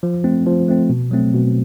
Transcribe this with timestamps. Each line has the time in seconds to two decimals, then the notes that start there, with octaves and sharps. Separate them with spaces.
0.03 F3
0.24 A3 C4
0.47 F3
0.68 A3 C4
0.89 B2
1.11 F#3 A3 C4
1.34 B2